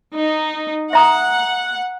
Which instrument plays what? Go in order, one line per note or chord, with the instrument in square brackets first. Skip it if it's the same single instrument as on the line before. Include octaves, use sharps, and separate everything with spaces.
[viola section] D#4
[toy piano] E5 A#5 D#6 [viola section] F#5